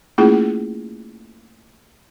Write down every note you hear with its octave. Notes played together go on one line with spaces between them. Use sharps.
A3 A#3 C#4 E4 F4 G#4